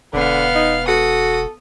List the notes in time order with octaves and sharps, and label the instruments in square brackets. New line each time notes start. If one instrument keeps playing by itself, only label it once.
[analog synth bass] E1 [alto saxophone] D3 [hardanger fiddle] B3 F5
[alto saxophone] D#4
[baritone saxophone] F#4 [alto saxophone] A4 [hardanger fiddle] D#6